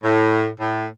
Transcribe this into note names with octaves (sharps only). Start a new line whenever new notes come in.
A2
A2